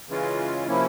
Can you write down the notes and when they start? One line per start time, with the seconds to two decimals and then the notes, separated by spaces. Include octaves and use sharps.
0.09 C#3 E3 G#3 C#4 F4
0.67 C3 F3 A#3 C#4 E4